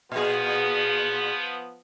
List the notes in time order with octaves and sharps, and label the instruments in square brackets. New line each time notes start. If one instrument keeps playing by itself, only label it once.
[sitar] A#2 G#4 [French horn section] F3 B3